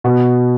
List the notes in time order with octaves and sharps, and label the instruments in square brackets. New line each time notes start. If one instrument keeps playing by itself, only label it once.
[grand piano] B2